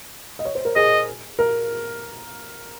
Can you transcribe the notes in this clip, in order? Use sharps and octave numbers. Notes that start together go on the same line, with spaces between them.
D#5
C#5
C5
A#4
G#4 D#5
A#4